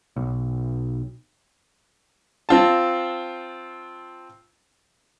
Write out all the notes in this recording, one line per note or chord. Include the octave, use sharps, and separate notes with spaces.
B1
C4 F4 A5